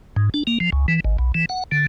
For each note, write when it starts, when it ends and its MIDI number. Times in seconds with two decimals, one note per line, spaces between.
0.16 0.30 44
0.34 0.43 62
0.47 0.58 58
0.60 0.70 53
0.72 0.86 37
0.88 1.00 52
1.05 1.17 32
1.19 1.32 35
1.35 1.45 52
1.49 1.64 78
1.72 1.86 50